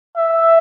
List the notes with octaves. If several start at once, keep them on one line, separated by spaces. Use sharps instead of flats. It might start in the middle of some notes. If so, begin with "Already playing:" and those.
E5